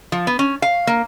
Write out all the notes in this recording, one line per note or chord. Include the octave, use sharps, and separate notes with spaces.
F3
B3
C#4
F5
A#3